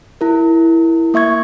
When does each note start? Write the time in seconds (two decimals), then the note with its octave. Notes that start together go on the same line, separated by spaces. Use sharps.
0.21 E4 A#4
1.14 A#3 E5 C#6 G#6